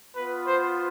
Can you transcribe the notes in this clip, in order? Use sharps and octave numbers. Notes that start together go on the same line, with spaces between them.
B3 F4 B4
C5